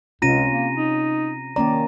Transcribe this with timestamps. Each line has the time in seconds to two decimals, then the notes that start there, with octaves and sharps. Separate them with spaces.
0.22 C#2 C3 C#4 F4 A#5 A#6 D#7
0.51 A#3
0.75 D#4
1.56 D#3 A#3 C#4 D5 A#5